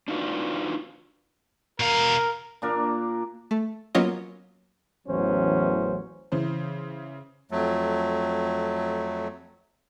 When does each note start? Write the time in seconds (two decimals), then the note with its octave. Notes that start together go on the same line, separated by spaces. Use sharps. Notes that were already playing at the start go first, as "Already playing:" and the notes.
0.08 D4 D#4 F4 F#4 B4 D5
1.80 B2 A#4 F5
2.62 A#2 D4 A#4 D6
3.51 A3
3.95 F#3 A#3 B3 C#4 F4 D#5
5.07 A1 E2 F#3 C#4 C5
6.32 C#3 E3 C5
7.51 F2 F#3 A3